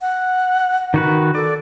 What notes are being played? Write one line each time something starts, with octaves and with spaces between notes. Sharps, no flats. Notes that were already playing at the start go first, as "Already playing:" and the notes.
F#5
D#3 F#4 B4
A4 D5